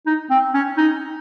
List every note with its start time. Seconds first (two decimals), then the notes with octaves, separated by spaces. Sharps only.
0.06 D#4
0.30 C4
0.54 C#4
0.77 D#4